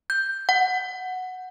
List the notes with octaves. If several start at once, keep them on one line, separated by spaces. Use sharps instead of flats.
G6
F#5